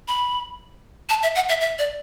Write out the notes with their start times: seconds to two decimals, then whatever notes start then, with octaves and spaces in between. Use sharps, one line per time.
0.08 B5
1.09 A5
1.23 E5
1.35 F#5
1.49 E5
1.61 E5
1.79 D5